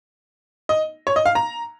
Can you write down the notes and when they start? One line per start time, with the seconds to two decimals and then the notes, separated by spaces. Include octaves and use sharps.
0.69 D#5
1.07 C#5
1.16 D#5
1.26 F5
1.35 A#5